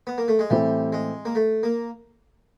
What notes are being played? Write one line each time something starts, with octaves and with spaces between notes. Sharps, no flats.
B3
A#3
A3
G#3
A2 E3 G3 A3 C4
G#3
A#3
A3
A#3